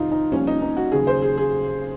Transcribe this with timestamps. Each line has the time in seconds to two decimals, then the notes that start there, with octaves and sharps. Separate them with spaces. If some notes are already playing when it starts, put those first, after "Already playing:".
Already playing: F2 C3 D#3 D#4 F4
0.11 D#4
0.32 C2 A#2 F3 C#4
0.47 D#4
0.62 D#4
0.77 F#4
0.92 D#2 C#3 F#3 G#4
1.07 C5
1.22 G#4
1.38 G#4